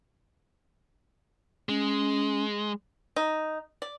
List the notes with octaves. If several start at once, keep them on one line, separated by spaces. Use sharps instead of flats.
G#3 C#4
D#4
D5